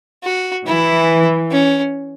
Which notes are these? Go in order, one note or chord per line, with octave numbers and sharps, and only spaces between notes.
F#4
E3 E4
C#4